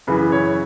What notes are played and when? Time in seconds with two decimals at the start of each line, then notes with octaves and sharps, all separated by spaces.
0.07 F#2 C#3 E3 B4
0.32 C#5